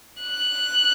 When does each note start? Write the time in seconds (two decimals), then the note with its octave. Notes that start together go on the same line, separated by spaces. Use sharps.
0.22 F#6